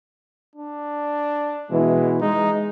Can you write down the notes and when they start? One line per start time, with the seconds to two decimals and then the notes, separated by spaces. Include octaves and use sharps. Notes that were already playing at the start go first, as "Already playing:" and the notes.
0.56 D4
1.71 B2 E3 G#3
2.21 G#3 D#4